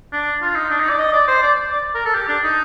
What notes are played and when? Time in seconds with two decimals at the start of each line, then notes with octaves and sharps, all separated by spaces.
0.13 D4
0.42 F4
0.55 D#4
0.70 D4
0.80 D#4
0.89 D5
0.99 D#5
1.13 D5
1.28 C5
1.42 D5
1.71 D5
1.95 A#4
2.05 A4
2.15 G4
2.28 D4
2.43 D#4